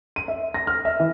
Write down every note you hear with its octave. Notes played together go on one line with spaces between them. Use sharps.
D#7
E5
A#6
F6
E5
E3